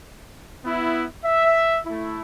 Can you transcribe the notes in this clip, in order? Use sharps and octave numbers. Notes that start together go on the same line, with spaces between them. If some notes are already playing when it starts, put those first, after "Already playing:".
B3 E4
E5
A3 E4